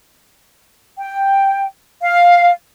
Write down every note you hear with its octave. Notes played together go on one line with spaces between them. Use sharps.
G5
F5